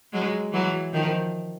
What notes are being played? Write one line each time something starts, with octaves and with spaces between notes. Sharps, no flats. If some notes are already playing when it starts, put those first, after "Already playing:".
F#3 G#3
E3 F#3
D#3 F3